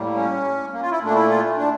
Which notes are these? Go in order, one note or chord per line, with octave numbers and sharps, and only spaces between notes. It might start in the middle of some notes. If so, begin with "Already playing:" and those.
Already playing: A2 G3 A#3
C#4
A#3
F4
E4
A#2 A3 D4
E4
F4
D4